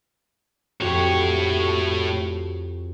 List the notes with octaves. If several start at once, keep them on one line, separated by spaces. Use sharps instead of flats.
F2 A2 F#4 G4 C#5